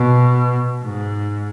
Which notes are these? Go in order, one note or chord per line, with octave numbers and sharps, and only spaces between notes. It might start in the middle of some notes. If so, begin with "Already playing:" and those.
Already playing: B2
G#2